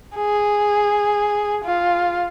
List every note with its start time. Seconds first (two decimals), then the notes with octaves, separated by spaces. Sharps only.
0.16 G#4
1.65 F4